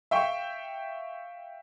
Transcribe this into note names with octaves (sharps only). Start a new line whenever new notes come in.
E5 F5 G5 C#6